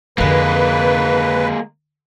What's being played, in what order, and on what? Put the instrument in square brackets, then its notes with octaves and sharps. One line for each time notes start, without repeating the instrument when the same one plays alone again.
[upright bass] F2 D3 [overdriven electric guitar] G#3 A#3 [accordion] B4